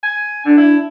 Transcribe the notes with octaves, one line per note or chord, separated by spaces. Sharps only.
G#5
D3 D4
E4